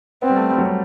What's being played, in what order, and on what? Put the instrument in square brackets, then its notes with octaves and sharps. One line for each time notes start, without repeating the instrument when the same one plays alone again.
[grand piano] B3 [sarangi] C4
[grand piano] G3
A3
G3
F#3
G3